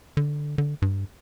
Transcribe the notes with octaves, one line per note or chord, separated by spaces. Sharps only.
D3
D3
G2